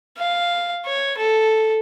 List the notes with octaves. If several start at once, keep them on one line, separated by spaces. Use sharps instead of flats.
F5
C#5
A4